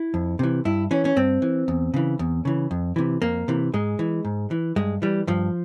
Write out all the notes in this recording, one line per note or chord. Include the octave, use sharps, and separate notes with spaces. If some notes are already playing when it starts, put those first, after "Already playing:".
Already playing: E4
F2
C3 E3
G2 E4
E3 C#4
C#4
G2 C4
E3
E2
C#3 E3
E2
C#3 E3
F2
C3 E3
F2 A#3
C3 E3
G#2 G#3
E3
G#2
E3
G2 G#3
E3 G3
G2 F3